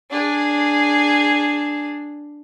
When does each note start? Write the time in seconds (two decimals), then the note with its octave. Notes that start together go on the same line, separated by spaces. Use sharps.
0.11 D4 G#4